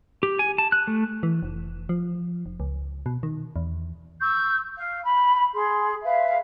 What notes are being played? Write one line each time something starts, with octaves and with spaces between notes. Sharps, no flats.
G4
G#5
A5
F#6
A3
E3
F1
F3
F1
C#2
B2
D#3
E2
C#6 E6 G6
F5
B5
G#4 C6
B4 E5 F5